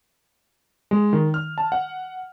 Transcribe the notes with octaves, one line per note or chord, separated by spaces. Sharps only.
G#3
D#3
F6
A5
F#5